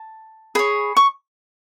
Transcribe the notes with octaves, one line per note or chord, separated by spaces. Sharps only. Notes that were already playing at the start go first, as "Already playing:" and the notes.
Already playing: A5
G#4 C#5 B5
C#6